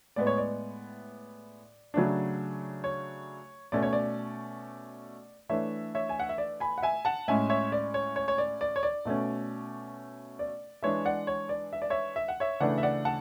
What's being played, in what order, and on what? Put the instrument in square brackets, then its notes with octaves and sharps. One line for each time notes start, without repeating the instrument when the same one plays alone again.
[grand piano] A2 G#3 B3 D5
C#5
D5
C#3 F#3 A3 D4
C#5
B2 A3 C#4 D5
C#5
D5
E3 A3 D4 C#5 E5
C#5 E5
G#5
F#5
E5
D5
G#5 B5
F#5
E5 G#5
F#5 A5
A2 G#3 C#4 E5 G#5
C#5 E5
D5
C#5
C#5
C#5
D5
D5
C#5
D5
B2 A3 C#4
D5
E3 G#3 D4 C#5 E5
D5 F#5
C#5
D5
E5
D5
C#5 E5
E5
F#5
C#5 E5
C#3 E3 A3 D4 D5 F#5
E5
D5 F#5
F#5 A5